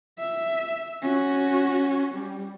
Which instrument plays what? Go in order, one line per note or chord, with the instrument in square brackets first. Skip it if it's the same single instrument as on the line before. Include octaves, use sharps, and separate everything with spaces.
[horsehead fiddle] E5
C#4 F#4
G3